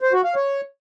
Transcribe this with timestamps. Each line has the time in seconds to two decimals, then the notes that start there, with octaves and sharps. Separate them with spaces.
0.01 C5
0.13 F#4
0.24 F5
0.36 C#5